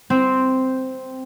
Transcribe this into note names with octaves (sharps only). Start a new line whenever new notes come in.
C4